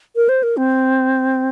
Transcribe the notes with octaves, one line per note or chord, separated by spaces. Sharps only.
A#4
C5
A#4
C4